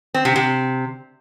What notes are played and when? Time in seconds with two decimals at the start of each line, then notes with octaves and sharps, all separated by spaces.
0.14 C4
0.25 C3
0.36 C3